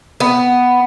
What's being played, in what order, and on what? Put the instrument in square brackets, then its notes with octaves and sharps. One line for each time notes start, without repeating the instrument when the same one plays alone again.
[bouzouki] B3